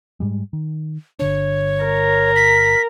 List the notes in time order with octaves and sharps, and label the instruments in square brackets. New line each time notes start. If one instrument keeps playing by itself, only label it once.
[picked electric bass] G#2 G3 G#3
D#3
[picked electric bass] G1 D3 D4 [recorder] C#5
[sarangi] A#4
[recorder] B6